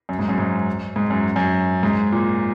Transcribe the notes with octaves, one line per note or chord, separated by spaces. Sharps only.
F#2
G#2
F#2
G#2
G#2
F#2
F#2
G#2
A#2